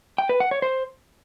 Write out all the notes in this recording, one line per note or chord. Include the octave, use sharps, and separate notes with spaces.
G5
B4
F#5
C#5
C5